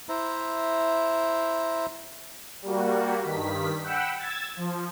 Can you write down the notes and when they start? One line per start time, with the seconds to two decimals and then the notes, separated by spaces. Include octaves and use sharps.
0.09 E4 C5 E5 A#5
2.62 G3 A#3 F#4
3.23 G2 D#3 B6
3.83 F#5 G5 B5 E6
4.18 E6 G#6 A6
4.57 F3